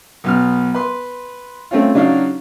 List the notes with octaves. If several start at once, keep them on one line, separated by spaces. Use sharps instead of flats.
B1 B3 F6
B4 C6
A3 C4 C#4 F4
C#3 F#3 D4 D#4 F#4 F5